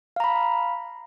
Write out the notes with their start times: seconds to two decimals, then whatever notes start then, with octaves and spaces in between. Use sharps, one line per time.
0.16 F5
0.20 A#5
0.24 B5